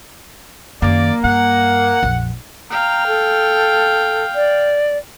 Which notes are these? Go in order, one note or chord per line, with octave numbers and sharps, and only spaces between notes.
F#2 D#3 A#3 D5
G2 F#5
A#1 F2
F5 G5 A#5
A4
D5